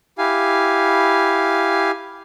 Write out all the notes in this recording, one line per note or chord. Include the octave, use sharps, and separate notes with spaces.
E4 G4 F5 G#5